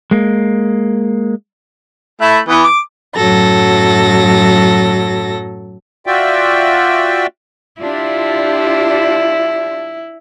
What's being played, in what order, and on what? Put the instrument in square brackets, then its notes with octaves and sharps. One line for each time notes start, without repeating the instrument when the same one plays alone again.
[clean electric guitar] G#3 A#3
[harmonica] A3 E4 E5
E3 B3
D6
[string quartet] F#2 A2 F#3 A4 A#6
[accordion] F4 F#4 D5 E5 G5
[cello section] D4 F4 G4 [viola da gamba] E4